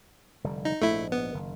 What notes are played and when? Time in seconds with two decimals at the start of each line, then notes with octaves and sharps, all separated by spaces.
0.44 F1 D3 G3
0.65 D#4
0.81 A#1 G#2 A3 E4
1.12 B3
1.33 F#1 D#3